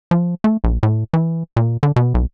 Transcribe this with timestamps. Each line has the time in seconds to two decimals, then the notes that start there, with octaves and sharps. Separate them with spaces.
0.11 F3
0.44 A3
0.64 A#1
0.83 A2
1.13 E3
1.57 A#2
1.83 D3
1.96 B2
2.14 B1